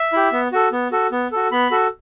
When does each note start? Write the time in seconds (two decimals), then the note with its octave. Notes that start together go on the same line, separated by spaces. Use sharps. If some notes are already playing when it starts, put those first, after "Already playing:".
Already playing: E5
0.13 E4 G4
0.32 B3
0.52 F#4 A4
0.72 B3
0.91 F#4 A4
1.12 B3
1.32 F#4 A4
1.52 B3 B5
1.71 F#4 A4